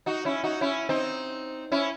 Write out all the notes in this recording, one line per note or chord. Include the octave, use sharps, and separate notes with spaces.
D#4 F#4
C#4 E4
D#4 F#4
C#4 E4
C4 D#4
C#4 E4